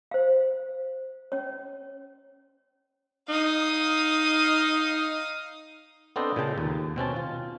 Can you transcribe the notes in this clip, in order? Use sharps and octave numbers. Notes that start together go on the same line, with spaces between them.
C5 F5
C#4 C#5
D#4 F5 D#6
B3 C4 D4 A4 C5 D#5
A#2 C#3 G5 A5
D#2
B2 C4 C#4 A5
F4